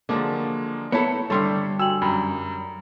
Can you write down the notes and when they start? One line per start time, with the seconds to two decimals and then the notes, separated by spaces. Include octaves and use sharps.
0.09 D3 F3 F#3 G#3 A#3
0.92 A3 B3 E4 A4 C#5 A#5 B5 C#7
1.30 G2 D3 G3 A3 A4 C#5 C6
1.79 F#4 G5 G#5 E6 F#7
2.02 F#2 A#5 B5